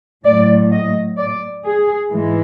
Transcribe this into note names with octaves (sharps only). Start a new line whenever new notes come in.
A2 F#3 A3 D5
D#5
D5
G#4
G#2 E3 G#3